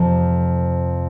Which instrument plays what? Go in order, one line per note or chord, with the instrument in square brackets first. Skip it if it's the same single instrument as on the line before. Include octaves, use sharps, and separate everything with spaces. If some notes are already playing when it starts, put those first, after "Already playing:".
Already playing: [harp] F2 C3 F3